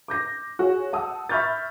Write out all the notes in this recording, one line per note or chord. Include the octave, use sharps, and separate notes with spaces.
D6 G6 A#6
F#4 G#4 C#5
F#5 A5 D#6 E6
E5 B5 C#6 F6 G6 A6